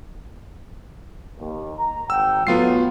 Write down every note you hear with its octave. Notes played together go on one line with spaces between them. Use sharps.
D#2
A#5
G#1 F#5 G5 E6
A2 F#3 B3 F4 C7